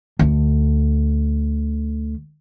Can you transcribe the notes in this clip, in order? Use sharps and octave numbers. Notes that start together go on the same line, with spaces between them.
D2 D3